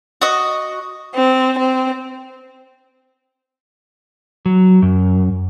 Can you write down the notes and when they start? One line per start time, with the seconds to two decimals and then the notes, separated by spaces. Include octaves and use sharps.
0.21 F#4 D#5
1.15 C4
1.58 C4
4.46 F#3
4.82 F#2